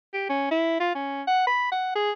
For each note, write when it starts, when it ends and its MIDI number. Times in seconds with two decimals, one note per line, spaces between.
0.14 0.27 67
0.29 0.51 61
0.51 0.80 64
0.80 0.93 65
0.95 1.22 61
1.27 1.44 78
1.47 1.68 83
1.72 1.93 78
1.96 2.11 68